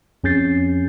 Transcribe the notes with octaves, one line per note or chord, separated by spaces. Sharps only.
F2 C#4 G#4 G6 A6 C7